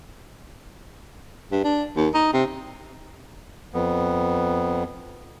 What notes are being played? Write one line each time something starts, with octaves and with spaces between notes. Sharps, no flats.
G2
D4
D#2
D#4
C3
F2 B3